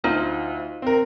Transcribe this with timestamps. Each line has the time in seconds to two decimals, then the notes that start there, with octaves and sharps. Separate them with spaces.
0.04 D2 D#4 F4 C5
0.82 C4 A#4